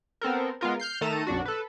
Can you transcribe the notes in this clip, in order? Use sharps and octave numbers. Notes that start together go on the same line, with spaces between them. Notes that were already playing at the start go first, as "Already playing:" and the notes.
B3 C4 A4 A#4
G#3 B3 F4 A#4
F6 G6 C7
D#3 A3 A4 A5 A#5 D#7
B1 F#2 D4 F#4
A4 B4